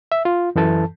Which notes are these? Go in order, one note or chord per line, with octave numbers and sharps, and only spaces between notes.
E5
F4
F#2 E3 A4 A5